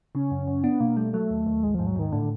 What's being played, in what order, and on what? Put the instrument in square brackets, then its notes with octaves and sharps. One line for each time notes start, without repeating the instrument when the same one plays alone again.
[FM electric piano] C#3 [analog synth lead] C#4
[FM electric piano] F#2
F#2
[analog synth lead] B3 [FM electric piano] D4
[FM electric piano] B2 [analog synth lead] A#3
[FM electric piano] G3 [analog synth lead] A3
[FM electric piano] F#3 [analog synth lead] A3
[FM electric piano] D#2
D#2
[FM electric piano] A1 [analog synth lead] G#3
[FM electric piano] G#2 [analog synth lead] F3
[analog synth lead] F#3
[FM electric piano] G#2 [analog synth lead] D#3
[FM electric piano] A2 [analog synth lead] D3